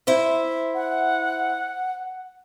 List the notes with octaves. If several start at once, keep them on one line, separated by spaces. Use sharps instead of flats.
E4 C5 E5
F#5